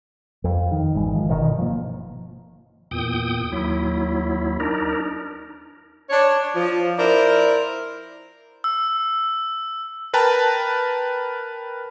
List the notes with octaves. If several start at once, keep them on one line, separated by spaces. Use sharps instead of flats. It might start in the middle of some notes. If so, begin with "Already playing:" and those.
F2
D#3
G#1 E3 G#3
D#3 F3
G1 B2 D#3
F3 A#3
E2 A#2 G5 D#6
D#2 F#3 E4
D4 D#4 A#4
D4 C#5
F3
E4 A#4 C5 D5
E6
A#4 B4 G5 A5 A#5